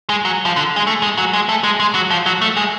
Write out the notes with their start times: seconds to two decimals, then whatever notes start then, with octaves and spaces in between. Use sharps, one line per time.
0.10 G#3
0.25 F#3
0.45 F3
0.56 D3
0.76 G#3
0.87 A3
1.03 G#3
1.18 F#3
1.33 G#3
1.49 A3
1.64 G#3
1.80 G#3
1.95 F#3
2.10 F3
2.26 F#3
2.41 A3
2.57 G#3